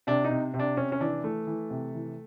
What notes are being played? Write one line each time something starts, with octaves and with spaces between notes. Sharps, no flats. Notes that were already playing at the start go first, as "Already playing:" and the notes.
C3 D4
D#4
C3
C3
D4
C3 C#4
C#4
E3 D4
E3 A3
E3
C3
E3